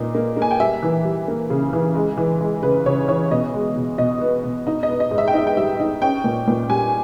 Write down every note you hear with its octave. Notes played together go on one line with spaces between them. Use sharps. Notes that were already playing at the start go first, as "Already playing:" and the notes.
Already playing: A#2 A#3 D#4
A#3
A#3
G#5
G5
G3 E5
E3
G3
A#3
C#3
E3
G#3
E3
G#3
C#3 B4
C#3 C#5
E3 C#5
B2 D#5
G#3
B2
B2 D#5
B3
B2
D#4
D#5
B3
D#5
G#2
E5
G5
D#4 E5
G5
G3 E5
D#4
C#4 G5
A#2
A#2
G3 G#5